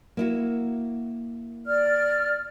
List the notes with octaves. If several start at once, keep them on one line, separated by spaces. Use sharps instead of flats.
A#3 E4 F#4
D5 F6